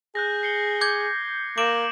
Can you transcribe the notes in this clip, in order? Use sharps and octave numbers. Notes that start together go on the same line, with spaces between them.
G#4 F#6 G6 A#6
C7 C#7 G7
D6 G6 G#6
A#3 D6 D7 E7 F#7